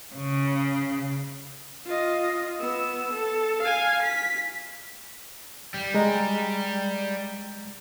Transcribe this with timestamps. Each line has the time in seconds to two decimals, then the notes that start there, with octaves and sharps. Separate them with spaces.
0.14 C#3
1.86 F4 D#5
2.60 B3 E6
3.13 A4
3.63 F5 G#5
4.03 B6
5.74 G3
5.94 G#3 A#5